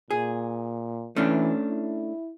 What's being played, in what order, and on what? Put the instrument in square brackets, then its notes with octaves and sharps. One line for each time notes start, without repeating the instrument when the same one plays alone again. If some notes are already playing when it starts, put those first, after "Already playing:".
[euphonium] A#2 [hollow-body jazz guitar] G#4
[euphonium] E3 [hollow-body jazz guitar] A3 C#4 D4
[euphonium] E4